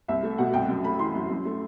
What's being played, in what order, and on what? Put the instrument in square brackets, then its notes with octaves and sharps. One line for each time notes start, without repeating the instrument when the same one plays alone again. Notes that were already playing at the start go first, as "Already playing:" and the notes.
[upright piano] C2 E5
A3
B2 F#5
C2 G5
F#2
A3 B5
E3 C6
F#2
F#2
A3